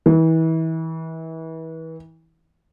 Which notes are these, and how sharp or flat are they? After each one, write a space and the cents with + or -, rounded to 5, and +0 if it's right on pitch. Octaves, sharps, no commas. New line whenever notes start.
E3 -30